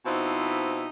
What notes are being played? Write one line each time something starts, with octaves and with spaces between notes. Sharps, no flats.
B2 F3 C4 D#4 E4